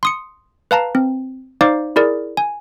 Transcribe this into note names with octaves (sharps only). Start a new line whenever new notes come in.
C6 D#6 C#7
B4 F5 A5 A#5
C4
D#4 C5 D5 F5 D6
E4 G#4 A#4 D5
G#5